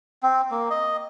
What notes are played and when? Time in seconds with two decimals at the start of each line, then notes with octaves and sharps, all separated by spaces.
0.23 C4
0.51 A#3
0.70 D#5